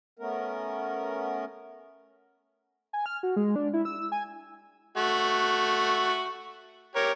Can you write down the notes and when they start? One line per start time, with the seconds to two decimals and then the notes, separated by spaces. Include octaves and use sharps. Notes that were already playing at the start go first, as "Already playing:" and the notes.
0.19 A3 B3 C#4 A#4
2.93 G#5
3.06 F6
3.23 F#4
3.36 G#3
3.56 D4
3.73 E4
3.85 E6
4.12 G#5
4.97 A3 F#4
6.96 G4 A#4 C#5